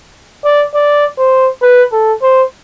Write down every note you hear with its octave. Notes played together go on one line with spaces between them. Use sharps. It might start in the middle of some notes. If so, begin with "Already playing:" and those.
D5
D5
C5
B4
A4
C5